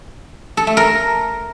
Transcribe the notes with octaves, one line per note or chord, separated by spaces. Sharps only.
A4
A3
A#4